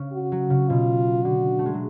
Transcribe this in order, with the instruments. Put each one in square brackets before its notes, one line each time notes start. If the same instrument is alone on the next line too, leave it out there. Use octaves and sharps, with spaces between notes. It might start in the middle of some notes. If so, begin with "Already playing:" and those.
Already playing: [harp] C#3
[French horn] F#4
[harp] F#3
C#3
[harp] B2 [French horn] F4
[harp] D3 [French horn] F#4
[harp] A3
G#3
F#3